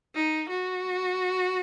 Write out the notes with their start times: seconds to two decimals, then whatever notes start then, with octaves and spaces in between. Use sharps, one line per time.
0.15 D#4
0.50 F#4